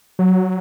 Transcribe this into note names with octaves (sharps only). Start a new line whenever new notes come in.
F#3